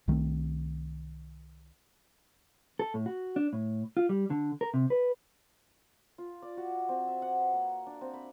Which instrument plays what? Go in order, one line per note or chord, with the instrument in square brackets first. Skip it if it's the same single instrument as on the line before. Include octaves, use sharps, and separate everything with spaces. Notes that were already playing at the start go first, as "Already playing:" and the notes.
[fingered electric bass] C2 D#3 A3 C4
[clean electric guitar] A4
A2
F#4
D4
A2
F4
G3
D3
A#4
C3
B4
[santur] F4
D5
F#4
C4
E5
F#5
B4
A#3
D4
C4
B5